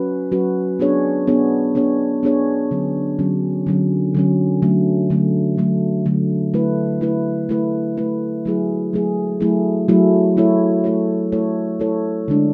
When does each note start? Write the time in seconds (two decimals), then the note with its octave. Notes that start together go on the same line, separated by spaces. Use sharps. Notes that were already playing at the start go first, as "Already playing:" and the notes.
Already playing: F#3 C#4 F#4 B4
0.31 F#3 C#4 F#4 B4
0.79 B3 D4 G#4 C#5
1.27 B3 D4 G#4 C#5
1.75 B3 D4 G#4 C#5
2.23 B3 D4 G#4 C#5
2.71 D3 F#3 C#4
3.19 D3 F#3 C#4
3.67 D3 F#3 C#4
4.15 D3 F#3 C#4
4.62 D3 F#3 A3
5.10 D3 F#3 A3
5.57 D3 F#3 A3
6.06 D3 F#3 A3
6.54 A3 E4 B4
7.01 A3 E4 B4
7.49 A3 E4 B4
7.97 A3 E4 B4
8.45 F#3 A3 E4 G#4
8.93 F#3 A3 E4 G#4
9.41 F#3 A3 E4 G#4
9.88 F#3 A3 E4 G#4
10.37 A3 E4 A4 C#5
10.84 A3 E4 A4 C#5
11.32 A3 E4 A4 C#5
11.80 A3 E4 A4 C#5
12.28 D3 G#3 D4